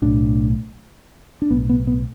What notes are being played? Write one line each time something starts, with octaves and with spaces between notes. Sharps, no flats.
B1 A2 D4
D4
B1 A2 B3
B3
B3